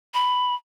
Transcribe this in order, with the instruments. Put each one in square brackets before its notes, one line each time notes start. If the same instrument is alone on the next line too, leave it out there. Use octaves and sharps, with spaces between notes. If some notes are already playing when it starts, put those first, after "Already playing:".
[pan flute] B5